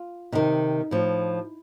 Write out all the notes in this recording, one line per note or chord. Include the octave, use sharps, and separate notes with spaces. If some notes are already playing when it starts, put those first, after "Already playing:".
Already playing: F4
C3 D#3 D#4
A2 F3